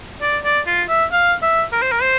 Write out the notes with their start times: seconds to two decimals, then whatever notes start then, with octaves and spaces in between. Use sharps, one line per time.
0.21 D5
0.44 D5
0.66 F4
0.89 E5
1.12 F5
1.42 E5
1.72 A#4
1.82 C5
1.92 A#4
2.02 C5